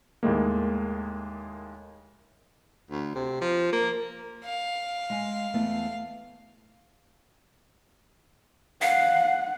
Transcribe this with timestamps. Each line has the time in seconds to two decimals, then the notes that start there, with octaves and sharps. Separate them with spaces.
0.23 D#2 A2 G#3 A#3
2.91 D2
3.15 C3
3.41 F3
3.73 A#3
4.45 F5
5.10 G#3 G#5
5.54 E2 A3 B3
8.82 F5 F#5